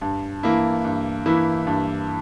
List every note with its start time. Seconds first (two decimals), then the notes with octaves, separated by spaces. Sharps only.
0.01 G2
0.43 E3 A#3 E4
0.84 G2
1.26 E3 A#3 E4
1.67 G2